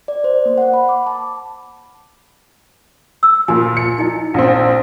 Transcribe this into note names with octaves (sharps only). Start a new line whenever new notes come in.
D5
C5
A#3
F#5
B5
D6
A5
E6
A#2 F3 F4 G#5
C#7
D#4 E4 D#5
A#1 C4